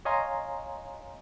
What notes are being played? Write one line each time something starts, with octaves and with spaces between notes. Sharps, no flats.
C#5 D#5 F5 G#5 A#5 C6